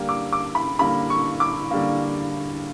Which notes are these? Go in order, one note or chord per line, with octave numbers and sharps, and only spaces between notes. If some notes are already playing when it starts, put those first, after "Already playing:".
Already playing: D3 G3 A#3
D6
D6
B5
D3 G3 A#3 B5
C#6
D6
D3 G3 A#3